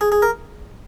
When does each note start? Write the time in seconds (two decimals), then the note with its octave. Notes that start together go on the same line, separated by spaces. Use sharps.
0.01 G#4
0.12 G#4
0.22 A#4